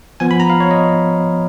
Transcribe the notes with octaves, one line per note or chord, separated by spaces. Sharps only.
F3 B3 G#5
B5
A#5
F5
C#5
D#5